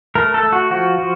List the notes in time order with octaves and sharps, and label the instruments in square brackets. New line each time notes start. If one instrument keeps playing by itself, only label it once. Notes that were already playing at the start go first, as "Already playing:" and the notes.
[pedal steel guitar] A3 A#4
A4
A3
F#4
F3 F#4
F3